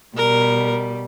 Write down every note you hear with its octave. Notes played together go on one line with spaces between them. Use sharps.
B2 G3 A#4